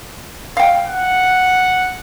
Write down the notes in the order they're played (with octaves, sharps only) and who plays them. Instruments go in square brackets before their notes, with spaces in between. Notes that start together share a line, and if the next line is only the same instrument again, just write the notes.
[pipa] F5 G5
[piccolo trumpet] F#5